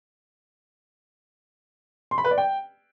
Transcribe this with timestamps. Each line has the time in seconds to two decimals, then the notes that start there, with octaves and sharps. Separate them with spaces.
2.11 C6
2.18 B5
2.24 B4
2.31 D5
2.38 G5